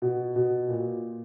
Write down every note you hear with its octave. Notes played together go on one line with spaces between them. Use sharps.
B2
B2
A#2